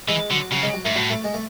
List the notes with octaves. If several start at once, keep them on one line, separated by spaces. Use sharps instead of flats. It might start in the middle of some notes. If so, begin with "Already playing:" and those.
E3 G#3
D3 F#3
C#3 F#3
G#3
F#3
G#2 A3
A2 F#3
A3
G#3
A3